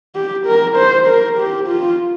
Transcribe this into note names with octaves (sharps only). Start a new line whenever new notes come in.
G4
A#4
C5
A#4
G4
F4